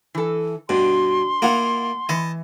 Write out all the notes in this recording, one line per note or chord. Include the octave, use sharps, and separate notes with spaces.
E3 A4
G2 B2 D4 C6
A#3 E4 F4 F#5 A#5
E3 D#5 A5